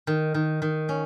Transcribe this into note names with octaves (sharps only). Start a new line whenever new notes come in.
D#3
D#3
D#3
C#4